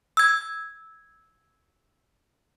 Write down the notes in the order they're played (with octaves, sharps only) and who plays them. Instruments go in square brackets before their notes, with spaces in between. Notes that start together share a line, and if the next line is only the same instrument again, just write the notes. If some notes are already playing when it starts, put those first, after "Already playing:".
[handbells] E6 G#6